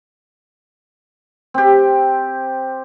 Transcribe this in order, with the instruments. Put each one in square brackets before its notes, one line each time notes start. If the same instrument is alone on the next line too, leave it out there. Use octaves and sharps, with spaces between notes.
[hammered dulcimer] C4 G4